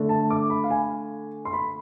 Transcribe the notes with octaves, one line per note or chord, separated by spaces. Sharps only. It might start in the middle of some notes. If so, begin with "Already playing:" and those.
Already playing: D3 A3 D4
A5
D6
B5
F5
G#5
C6
B5